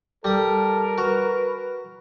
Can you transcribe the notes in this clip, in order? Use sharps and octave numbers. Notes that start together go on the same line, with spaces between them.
G3 A4 A#4 D#6
F#4 B4